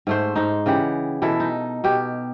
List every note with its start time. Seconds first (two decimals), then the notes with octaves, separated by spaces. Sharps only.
0.07 G#2 A3 C5
0.36 G#2 D#4
0.66 C#3 E3 G4 F#5
1.22 B2 E3 E4 A4
1.40 D#4
1.84 B2 G4